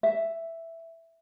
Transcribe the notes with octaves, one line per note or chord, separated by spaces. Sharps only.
E5